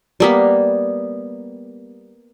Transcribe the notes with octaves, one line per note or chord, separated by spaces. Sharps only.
G3 A#3 B3